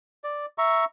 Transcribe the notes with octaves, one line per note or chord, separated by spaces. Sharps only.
D5
E5 A#5 C#6